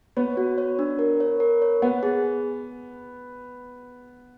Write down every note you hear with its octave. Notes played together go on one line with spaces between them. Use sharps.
B3 C#5
F#4
C#5
D4
A#4
C#5
A#4
C#5
B3 F#5
G#4